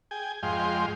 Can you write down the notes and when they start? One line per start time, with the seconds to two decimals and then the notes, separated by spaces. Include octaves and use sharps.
0.11 G#4 G5 G#5
0.43 F2 G#2 G#3 F5 G5 C6